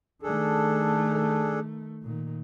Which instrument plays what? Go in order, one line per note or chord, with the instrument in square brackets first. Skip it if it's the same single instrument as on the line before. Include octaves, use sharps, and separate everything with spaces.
[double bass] D#3 A3 [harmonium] D4 G#4 A4
[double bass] A#2 D#3